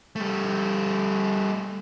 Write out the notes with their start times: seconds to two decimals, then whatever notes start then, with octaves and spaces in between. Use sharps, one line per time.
0.16 G3 A3